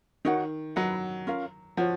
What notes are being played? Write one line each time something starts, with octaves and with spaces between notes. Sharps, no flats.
D#3 D#4 F#4 C#5 F#5
F#3 B4 D#5 F#5 B5
C#4 F4 A#4 F5
F3 F#4 C#5 F#5